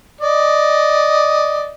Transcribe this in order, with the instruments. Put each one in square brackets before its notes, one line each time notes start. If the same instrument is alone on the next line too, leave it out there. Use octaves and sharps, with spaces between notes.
[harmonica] D5 D#5